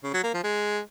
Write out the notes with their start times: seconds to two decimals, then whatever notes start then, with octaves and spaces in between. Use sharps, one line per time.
0.04 C#3
0.14 F#3
0.24 A#3
0.34 F3
0.44 G#3